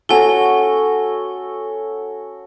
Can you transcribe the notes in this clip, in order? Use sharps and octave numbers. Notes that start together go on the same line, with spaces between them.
C#4 F#4 A4 G#5 G7